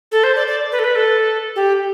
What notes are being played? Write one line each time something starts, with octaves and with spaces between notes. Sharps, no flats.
A4
C5
D5
D5
B4
A4
B4
A4
G4